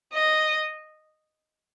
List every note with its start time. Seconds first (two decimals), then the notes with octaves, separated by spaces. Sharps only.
0.13 D#5